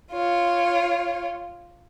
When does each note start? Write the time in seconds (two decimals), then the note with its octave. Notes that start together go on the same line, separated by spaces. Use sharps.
0.12 F4 C#5